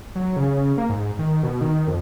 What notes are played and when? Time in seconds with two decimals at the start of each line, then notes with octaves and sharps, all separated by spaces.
0.15 F#3
0.36 C#3
0.51 C#3
0.77 A#3
0.89 G#2
1.19 D#3
1.43 B2
1.61 D#3
1.87 F2